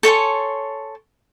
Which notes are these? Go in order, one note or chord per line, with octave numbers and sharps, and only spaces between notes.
A4 C#5 G#5 C6